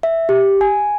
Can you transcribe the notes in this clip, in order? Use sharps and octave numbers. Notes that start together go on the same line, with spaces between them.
E5
G4
G#5